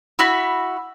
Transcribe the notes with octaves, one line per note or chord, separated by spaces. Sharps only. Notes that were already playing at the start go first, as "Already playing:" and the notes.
E4 F#4 B5